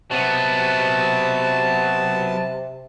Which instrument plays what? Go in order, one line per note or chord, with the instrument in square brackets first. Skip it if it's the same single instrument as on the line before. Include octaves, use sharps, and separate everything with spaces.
[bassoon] C3 [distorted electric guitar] F#3 B3 [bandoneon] A5